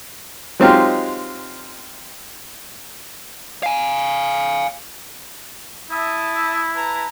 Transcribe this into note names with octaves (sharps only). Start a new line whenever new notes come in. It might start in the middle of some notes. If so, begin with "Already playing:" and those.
F#3 G#3 C4 D#4 F4 G4
F5 G#5
E4 E5 A5 D#6
B4 A5 A#5